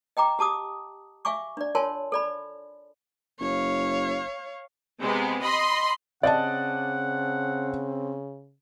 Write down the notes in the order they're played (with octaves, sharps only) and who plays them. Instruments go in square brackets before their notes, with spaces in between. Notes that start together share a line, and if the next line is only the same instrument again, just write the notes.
[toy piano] D#5 G5 A#5 D6
G4 A5 D6 D#6
E5 F5 G#5 C#6 D6
D4 D5
F4 A#4 C#5 G#5 A5 C6
A4 D5 B5
[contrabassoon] F#1 [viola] C#5 F5
[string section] C3 G#3 B3
D#5 B5 C6
[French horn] C#3 [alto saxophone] C4 [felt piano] D5 D#5 A5 [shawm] F#5